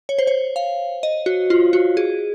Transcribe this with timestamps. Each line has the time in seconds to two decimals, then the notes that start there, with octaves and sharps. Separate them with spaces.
0.09 C#5
0.19 C5
0.27 C#5
0.56 F5
1.03 D#5
1.26 F#4
1.50 F4
1.73 F#4
1.97 G#4